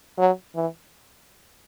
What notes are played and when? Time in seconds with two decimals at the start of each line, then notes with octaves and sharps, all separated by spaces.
0.18 F#3
0.55 E3